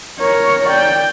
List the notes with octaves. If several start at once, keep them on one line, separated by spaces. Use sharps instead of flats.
A#4 C#5
D5 G5